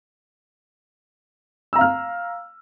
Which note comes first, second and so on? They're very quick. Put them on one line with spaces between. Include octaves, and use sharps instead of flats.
E6 A#5 F5 F6